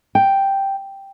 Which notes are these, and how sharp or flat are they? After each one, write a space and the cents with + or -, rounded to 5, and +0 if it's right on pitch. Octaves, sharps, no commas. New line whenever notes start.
G5 +0